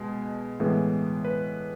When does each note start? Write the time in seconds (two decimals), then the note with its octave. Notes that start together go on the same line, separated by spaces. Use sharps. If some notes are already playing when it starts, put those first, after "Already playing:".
Already playing: B2 G#3
0.60 A2 E3 G#3 B3
1.25 B4